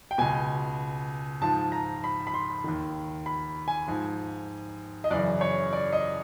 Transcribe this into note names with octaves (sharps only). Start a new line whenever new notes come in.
G5
C#2 B2 G#5
G#2 F3 A5
A#5
B5
B5
C6
D#2 D#3
B5
G#5
G#2 F3
D#5
F#2 C#3 E3 D5
C#5
D5
D#5